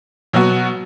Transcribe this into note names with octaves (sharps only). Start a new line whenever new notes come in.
B2 F#3 B3 F#4